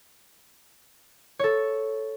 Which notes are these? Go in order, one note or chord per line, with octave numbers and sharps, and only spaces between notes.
A4 C#5